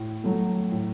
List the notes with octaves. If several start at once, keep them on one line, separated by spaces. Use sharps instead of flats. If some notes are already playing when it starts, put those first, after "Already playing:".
Already playing: A2
F#3 A3
A2